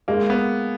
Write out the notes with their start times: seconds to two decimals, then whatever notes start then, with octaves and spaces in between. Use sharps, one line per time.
0.08 G#3 A#3
0.30 B3